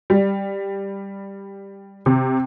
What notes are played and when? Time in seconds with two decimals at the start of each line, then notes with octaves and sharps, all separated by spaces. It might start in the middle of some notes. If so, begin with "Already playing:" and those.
0.10 G3
2.06 C3